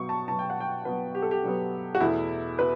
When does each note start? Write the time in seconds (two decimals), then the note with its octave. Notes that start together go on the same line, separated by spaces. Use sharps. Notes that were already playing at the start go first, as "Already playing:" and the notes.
Already playing: B2 F#3 B3 C#6
0.09 A5
0.28 B2 F#3 B3 A5
0.39 G5
0.50 F#5
0.60 G5
0.85 B2 F#3 B3 B4
1.15 G4
1.22 A4
1.31 G4
1.43 B2 F#3 B3
1.95 F#4
2.01 E2 B2 A3 E4
2.59 B2 B4